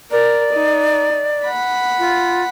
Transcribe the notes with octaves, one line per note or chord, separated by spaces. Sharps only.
A#4 D5
D#4
F#5 B5
F4